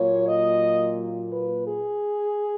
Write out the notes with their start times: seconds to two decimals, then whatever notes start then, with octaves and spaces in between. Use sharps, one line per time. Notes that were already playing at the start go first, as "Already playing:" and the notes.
Already playing: A#2 F#3 A#3 C#5
0.27 D#5
1.32 B4
1.68 G#4